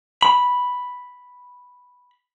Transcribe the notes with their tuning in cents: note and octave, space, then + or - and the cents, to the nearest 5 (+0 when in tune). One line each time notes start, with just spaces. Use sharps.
B5 +0